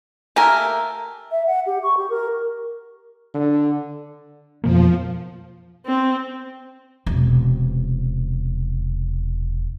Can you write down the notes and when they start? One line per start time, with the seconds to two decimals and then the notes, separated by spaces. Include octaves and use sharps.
0.36 A3 A#3 G4 A#4 G#5
1.31 E5
1.47 F#5
1.66 G4
1.83 C#6
1.97 G4
2.10 A#4
3.34 D3
4.64 F2 B2 F3 A#3
5.86 C4
7.06 E1 C3